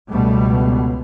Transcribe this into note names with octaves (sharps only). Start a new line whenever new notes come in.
C#2 B2 G3 A3